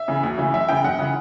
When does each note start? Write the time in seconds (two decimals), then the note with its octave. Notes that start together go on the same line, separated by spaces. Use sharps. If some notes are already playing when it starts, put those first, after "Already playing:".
Already playing: E5
0.08 C#3 E3
0.23 D2
0.38 C#3 E3
0.54 F#2 E5
0.68 C#3 E3 G5
0.84 F#2 F#5
0.99 C#3 E3